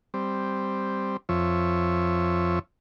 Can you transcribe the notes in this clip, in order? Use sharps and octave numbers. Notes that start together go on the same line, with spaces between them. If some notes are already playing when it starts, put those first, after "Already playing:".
G3 C4
F2 F3 C#5 E5